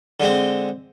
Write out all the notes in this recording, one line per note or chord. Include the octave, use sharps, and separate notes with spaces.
D3 G#3 C4